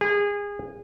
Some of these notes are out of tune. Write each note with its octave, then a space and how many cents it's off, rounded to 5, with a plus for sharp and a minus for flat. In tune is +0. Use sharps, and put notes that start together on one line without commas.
G#4 -25